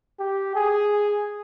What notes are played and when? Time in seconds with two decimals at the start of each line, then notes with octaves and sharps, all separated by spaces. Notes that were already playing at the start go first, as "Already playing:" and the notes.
0.20 G4
0.55 G#4